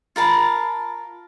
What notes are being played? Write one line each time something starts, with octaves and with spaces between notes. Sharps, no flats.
F4 A#4 A5 B5